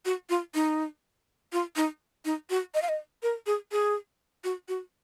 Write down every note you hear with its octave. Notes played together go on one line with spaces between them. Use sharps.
F#4
F4
D#4
F4
D#4
D#4
F#4
D#5
F5
D#5
A#4
G#4
G#4
F#4
F#4